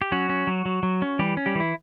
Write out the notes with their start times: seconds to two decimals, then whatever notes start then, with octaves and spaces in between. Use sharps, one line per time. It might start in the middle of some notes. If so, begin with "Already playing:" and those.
0.02 G4
0.12 F#3 C#4 F#4
0.29 C#4
0.47 F#3
0.66 F#3
0.83 F#3
1.02 C#4
1.19 E3 G3 G4
1.37 C#4
1.46 G3 G4
1.55 E3 E4